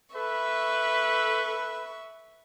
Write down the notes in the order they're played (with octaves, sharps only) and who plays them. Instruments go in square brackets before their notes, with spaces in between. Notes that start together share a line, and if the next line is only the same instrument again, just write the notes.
[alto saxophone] A4 [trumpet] B4 [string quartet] E5 C#6